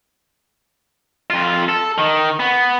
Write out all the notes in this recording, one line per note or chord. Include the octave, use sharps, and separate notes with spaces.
F2 F4
A4
D#3
B3